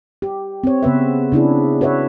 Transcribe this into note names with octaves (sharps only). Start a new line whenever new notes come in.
G4
C4 C#5
C#3 B3 B4 E5
C#3 D4 E4 G#4
F#4 B4 C#5 E5